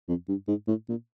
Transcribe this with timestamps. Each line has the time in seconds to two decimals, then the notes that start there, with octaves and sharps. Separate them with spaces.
0.08 F2
0.28 G2
0.48 G#2
0.68 A2
0.89 A#2